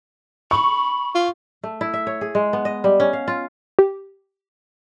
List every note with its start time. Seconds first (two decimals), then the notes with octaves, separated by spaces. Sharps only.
0.51 B5 C#6
1.15 F4
1.63 A3
1.81 E4
1.94 E5
2.07 C#5
2.21 G#4
2.35 G#3
2.53 B3
2.65 D#5
2.84 G3
3.00 C#4
3.13 F5
3.28 F4
3.79 G4